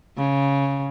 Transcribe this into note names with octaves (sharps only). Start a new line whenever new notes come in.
C#3